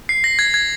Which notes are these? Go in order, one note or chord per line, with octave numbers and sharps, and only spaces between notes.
C7
A#6
G#6
G#6